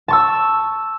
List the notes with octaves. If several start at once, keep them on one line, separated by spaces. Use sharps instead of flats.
A5 C#6 E6